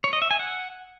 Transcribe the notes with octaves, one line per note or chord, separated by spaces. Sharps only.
C#5
D#5
E5
G#5
F#5